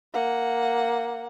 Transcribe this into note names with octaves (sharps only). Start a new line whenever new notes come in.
A#3 F#5